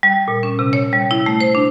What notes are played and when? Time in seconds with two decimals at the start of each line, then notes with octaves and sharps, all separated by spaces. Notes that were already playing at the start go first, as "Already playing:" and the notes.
0.03 G3
0.28 A#2
0.43 C#4
0.59 C3
0.73 C#5
0.93 G3
1.11 E4
1.26 A3
1.41 C5
1.55 D4